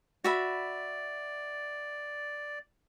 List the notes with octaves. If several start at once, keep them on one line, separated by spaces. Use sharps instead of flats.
F#4 D5 E5 B5